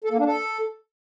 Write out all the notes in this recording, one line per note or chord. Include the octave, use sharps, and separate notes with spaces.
A4
A#3
D4
A4